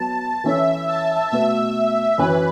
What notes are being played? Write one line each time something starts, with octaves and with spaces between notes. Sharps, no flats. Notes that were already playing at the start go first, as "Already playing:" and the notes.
Already playing: F#3 B3 A5
E3 C#4 E4 A4 C#5 E5
A5
B2 A3 F#4 B4 E5
F#2 E3 C#4 B4